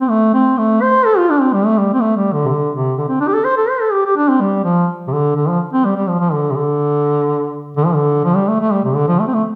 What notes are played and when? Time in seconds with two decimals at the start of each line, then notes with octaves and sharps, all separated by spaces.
0.01 C4
0.10 A3
0.34 C4
0.58 A3
0.82 C5
1.06 A4
1.18 F4
1.30 D4
1.41 C4
1.53 G3
1.66 A3
1.78 G3
1.94 C4
2.01 A3
2.17 G3
2.33 D3
2.45 C3
2.49 D3
2.73 C3
2.98 D3
3.09 C4
3.20 D4
3.28 G4
3.34 A4
3.45 C5
3.57 A4
3.69 C5
3.81 A4
3.92 G4
4.05 G4
4.16 D4
4.29 C4
4.41 G3
4.64 F3
5.08 C3
5.12 D3
5.36 D3
5.48 F3
5.73 C4
5.85 G3
5.96 G3
6.08 F3
6.20 F3
6.33 D3
6.51 C3
6.56 D3
7.77 D3
7.86 F3
7.95 D3
8.25 F3
8.35 G3
8.48 A3
8.60 A3
8.72 G3
8.84 C3
8.95 D3
9.08 F3
9.19 A3
9.27 C4
9.34 A3